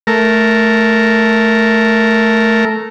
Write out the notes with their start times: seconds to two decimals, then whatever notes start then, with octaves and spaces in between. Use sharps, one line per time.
0.07 A3 A#4